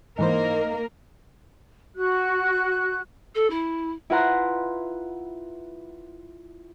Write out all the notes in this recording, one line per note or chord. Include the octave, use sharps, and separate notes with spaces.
G#2 E3 A#3 D#4 A#4 C5
F#4 F#6
A4
E4
E4 F4 B4 F#5 A#5 C6